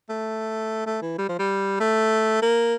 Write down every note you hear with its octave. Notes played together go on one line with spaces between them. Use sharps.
A3
A3
E3
G3
F3
G3
A3
A#3